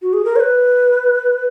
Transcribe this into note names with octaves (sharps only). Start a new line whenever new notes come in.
F#4
G#4
A#4
C#5
B4